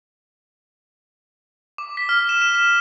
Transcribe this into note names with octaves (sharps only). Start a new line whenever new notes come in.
D6
B6
F6
E7
E7
E7